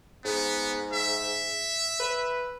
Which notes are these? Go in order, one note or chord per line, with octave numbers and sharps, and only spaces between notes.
G#2 B3
E5
B4